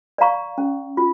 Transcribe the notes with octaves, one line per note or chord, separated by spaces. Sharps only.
D5 F5 A#5 C#6
C#4
F4